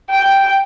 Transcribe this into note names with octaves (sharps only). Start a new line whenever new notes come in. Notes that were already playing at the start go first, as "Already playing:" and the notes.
G5